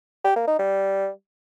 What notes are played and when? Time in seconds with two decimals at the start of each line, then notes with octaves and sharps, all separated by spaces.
0.25 G4
0.36 A#3
0.48 D#4
0.59 G3